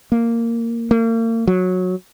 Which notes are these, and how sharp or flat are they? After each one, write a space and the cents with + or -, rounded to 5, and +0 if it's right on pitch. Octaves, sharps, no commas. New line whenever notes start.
A#3 -10
A#3 -40
F#3 -15